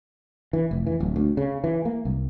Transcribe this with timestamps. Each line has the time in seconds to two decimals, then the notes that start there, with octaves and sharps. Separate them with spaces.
0.53 E3
0.71 F1
0.87 E3
1.00 D1
1.16 D2
1.37 C#3
1.64 E3
1.85 A#3
2.05 C2